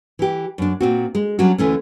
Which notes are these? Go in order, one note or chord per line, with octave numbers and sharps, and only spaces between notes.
E3 G4
F#2 D4
A#2 C4 F#4
G#3
F#3 G3 C#4 D4 F#4
D2 E3 A3 C#4